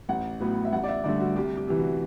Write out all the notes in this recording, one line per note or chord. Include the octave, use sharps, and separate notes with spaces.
A1 F#5
A2 F#3 B3
E5
A1 F#5
D5
E5
G2 D3 A3 D5
F#4
C2 G4
G4
C3 E3
F#4